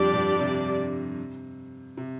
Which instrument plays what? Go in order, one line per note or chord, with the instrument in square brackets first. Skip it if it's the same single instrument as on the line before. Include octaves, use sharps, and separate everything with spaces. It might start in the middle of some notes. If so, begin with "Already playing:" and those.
Already playing: [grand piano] F2 D3 [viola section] G3 D4 G4 D5
[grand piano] G2
C3
C3